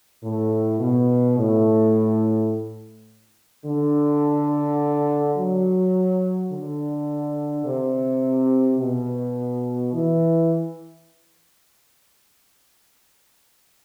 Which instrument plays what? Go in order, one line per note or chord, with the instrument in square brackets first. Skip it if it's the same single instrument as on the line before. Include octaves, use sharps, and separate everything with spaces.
[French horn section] A2
B2
A2
D3
F#3
D3
C3
B2
E3